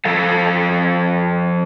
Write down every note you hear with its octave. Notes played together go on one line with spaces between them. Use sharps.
F3 A4 F5